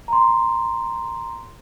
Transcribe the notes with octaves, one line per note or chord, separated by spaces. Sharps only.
A#5 C6